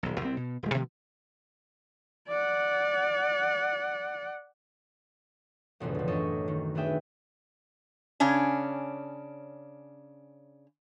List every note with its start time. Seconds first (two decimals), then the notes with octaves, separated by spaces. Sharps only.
0.03 D#1 B1
0.21 C2 C3 A3 C4
0.37 B2
0.63 D#1 G#3
0.74 B2 D#3 F3 A3
2.29 D5 F#5
5.80 E1 B1 F2 A2 C#3
5.95 D3 F3
6.07 F#2 A4 C#5 D#5
6.48 D#3
6.75 A3 B3 D4 G#4 E5 G5
8.20 C#3 C#4 D4